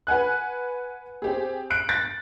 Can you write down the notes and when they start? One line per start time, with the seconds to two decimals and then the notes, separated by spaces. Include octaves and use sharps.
0.07 B4 F#5 G#5 F#6
1.22 C4 G4 G#4
1.70 F#6 D7
1.89 A6